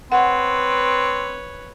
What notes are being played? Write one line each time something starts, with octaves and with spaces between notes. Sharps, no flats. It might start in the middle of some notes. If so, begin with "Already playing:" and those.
C4 B4 C#5 F#5